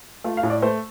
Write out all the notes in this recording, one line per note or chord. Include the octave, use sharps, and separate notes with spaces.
A3 F4
F5
A2
D5
A3 C5